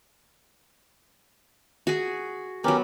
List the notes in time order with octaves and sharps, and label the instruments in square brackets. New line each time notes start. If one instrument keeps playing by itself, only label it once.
[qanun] F#4 G#4
[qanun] F#3 B3 [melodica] C#4 G4 A#4